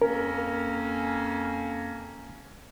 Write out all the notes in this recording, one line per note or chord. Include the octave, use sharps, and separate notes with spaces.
F2 A#3 C#4 A#4